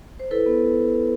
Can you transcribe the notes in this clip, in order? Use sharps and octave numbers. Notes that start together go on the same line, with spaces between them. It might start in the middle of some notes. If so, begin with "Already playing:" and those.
C5
E4 A4 B4
B3